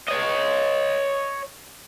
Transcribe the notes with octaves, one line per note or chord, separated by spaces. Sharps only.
C#5 D#5